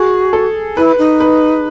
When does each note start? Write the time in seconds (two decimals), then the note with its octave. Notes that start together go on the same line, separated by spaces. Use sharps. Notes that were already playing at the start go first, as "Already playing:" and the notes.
Already playing: F#4 G#4
0.33 A4
0.77 E4 B4
0.98 D#4
1.20 B4